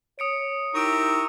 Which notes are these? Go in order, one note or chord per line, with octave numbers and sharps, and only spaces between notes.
C#5 D#6 C#7 D7
D#4 E4 G4 A#4 C#6 E6 D7